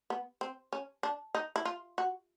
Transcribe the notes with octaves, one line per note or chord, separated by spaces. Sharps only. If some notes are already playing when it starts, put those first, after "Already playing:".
B3
C4
C#4
D4
D#4
E4
F4
F#4